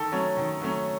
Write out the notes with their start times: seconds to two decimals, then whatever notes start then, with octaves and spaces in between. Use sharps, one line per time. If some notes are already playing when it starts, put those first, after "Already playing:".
Already playing: D#3 A4
0.12 F#3 A3 C#4
0.37 D#3
0.61 F#3 A3 C#4